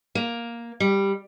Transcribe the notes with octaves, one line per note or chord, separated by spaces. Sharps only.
A#3
G3